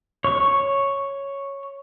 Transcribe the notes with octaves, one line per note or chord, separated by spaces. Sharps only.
C#5 C#6